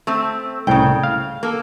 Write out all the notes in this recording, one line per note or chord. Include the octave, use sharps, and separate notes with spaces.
A3 C4
C2 A2 C#3 G5
F5
A#3 A4